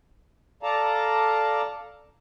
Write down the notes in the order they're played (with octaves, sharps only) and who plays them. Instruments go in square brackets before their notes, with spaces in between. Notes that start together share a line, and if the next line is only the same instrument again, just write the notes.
[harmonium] A4 D5 F5 A5 A#5